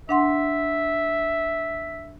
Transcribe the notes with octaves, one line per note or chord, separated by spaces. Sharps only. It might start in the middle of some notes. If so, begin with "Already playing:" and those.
D4 E5 F#5 C6